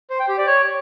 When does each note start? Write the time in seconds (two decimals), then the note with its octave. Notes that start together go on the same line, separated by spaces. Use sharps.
0.10 C5
0.19 G5
0.29 G4
0.38 D5
0.47 C#5